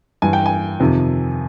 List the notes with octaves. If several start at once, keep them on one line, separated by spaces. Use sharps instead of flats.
G2 E3 G#5
G5
G#5
F2 C3 D#3